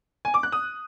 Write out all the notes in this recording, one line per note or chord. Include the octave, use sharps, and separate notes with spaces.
G#5
D6
F#6
D#6